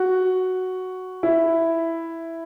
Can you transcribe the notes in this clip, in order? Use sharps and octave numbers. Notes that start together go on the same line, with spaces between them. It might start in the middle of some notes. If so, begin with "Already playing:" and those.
Already playing: F#4
E4